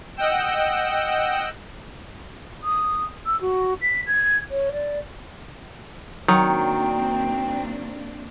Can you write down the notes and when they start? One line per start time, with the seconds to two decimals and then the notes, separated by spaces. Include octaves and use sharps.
0.16 D#5 F#5 G5 E6
2.63 D#6
3.26 E6
3.41 F#4
3.82 B6
4.07 G#6
4.51 C#5
4.72 D5
6.28 D#3 F#3 A#3 C4 D4 G5